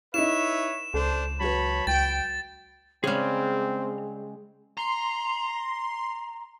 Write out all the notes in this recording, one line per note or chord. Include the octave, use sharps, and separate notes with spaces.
D#4 E4 B4 C#5 E5 E7
C#2 D4 A4 C5
F#3 B4 C#5 A5 B5
C#2 G5 A6
C#3 G3 G#3 C4 G#4 F6
A#5 C6